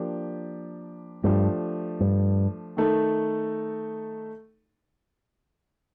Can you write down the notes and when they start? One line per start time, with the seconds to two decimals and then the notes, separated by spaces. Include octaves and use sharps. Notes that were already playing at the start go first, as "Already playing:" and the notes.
Already playing: F3 A#3 D4 G4
1.23 G2 F3 A3 D4 G4
2.00 G2
2.77 D#3 A3 D#4 A4